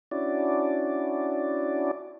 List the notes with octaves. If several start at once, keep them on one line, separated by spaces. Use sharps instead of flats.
C#4 D4 E4 F#4 D5